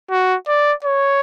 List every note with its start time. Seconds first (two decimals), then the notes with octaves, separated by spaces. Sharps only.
0.11 F#4
0.48 D5
0.84 C#5